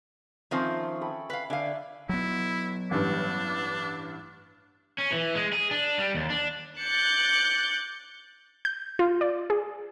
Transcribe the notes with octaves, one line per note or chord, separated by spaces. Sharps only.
D#3 F3 A3 C4 C#4 C5
A4 G5 B5
B4 F5
D3 D5 E5 F5 G#5
F#3 B3 E4
A1 G2 D4
C#4
E3
G#3
G#4
D4
G3
D#2
D4
D6 F#6 G6 A6 C#7
G6
F4
D5
G#4